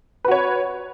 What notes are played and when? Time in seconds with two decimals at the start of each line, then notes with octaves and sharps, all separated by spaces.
0.25 B4
0.28 F#4
0.31 C#5